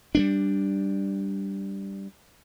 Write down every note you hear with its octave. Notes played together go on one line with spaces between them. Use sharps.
G3 A3 D4